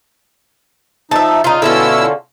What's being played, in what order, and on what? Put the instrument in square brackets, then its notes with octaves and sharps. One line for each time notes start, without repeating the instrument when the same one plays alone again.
[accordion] F3 D#4 [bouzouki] E5 A5
[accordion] C#3 [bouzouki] D#4 F4
[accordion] B2 E4 E6 [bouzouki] D3 C#4 F4